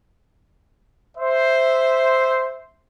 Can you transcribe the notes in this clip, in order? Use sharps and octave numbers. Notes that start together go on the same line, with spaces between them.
C5 E5